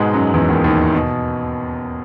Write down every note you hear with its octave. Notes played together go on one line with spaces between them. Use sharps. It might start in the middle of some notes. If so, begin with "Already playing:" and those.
Already playing: G#2 B2 G#3 B3
F#2 F#3
E2 E3
D#2 D#3
D#2 D#3
B2